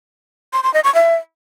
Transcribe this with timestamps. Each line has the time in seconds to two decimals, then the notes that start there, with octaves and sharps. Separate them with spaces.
0.53 C6
0.63 C6
0.74 D#5
0.84 C#6
0.95 E5